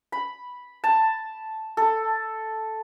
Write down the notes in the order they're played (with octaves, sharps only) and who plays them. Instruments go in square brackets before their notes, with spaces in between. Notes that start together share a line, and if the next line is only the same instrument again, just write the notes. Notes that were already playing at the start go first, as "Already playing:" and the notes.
[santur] B5
A5
A4